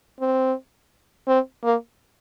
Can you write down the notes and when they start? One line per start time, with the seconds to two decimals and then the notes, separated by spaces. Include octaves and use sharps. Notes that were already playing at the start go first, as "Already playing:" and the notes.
0.21 C4
1.28 C4
1.64 A#3